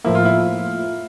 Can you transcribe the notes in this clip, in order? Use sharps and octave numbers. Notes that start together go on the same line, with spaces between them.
A2 F3 A#3 E4
F4
E4